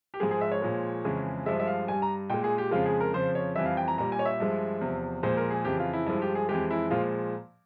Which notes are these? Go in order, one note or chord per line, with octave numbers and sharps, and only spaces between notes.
G4
G#2 F3 G#3 G#4
G#4
E5
C#5
A#2 F3 G#3
F2 C#3 E3 G#3
G2 F3 G#3 E5
E5
F5
G2 G3 G#5
A#5
A#2 G#3 G5
G#4
G4
F2 C#3 F3 G#3 F4
G#4
A#4
F2 C#3 F3 C5
C#5
F2 E3 G3 E5
F5
G5
A#5
A#2 G3 A#5
G#5
C#5
E5
G2 F3 G#3
E2 C3 F3
A#2 F3 G#3 C5
A#4
G#4
F2 C#3 E3 G4
F4
E4
G2 F3 G#3 E4
G4
G#4
F2 E3 G#3 G4
E4
A#2 F3 G#3 F4